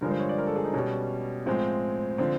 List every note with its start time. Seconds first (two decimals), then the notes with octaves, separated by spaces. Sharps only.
0.01 G2 D3 F3 G#3 A#4
0.11 C5
0.19 C#5
0.29 D5
0.38 A#4
0.47 A4
0.56 G#4
0.64 D#4
0.74 B2 G3 C#4
1.46 A2 F3 G#3 C4
2.18 D3 F3 C4